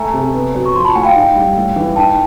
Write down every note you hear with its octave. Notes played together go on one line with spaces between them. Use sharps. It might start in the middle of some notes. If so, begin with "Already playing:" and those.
Already playing: A3 G#5 A#5
C3
B3
F#3
C#6
F3 C6
A5 B5
A2 F#5 G#5
F5 G5
D#4
G3
A2
E3
D#4 G5 A5